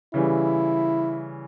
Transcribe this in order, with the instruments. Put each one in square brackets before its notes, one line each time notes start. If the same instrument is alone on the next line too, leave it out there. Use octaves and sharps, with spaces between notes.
[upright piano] C#3 E3 G3 [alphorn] E4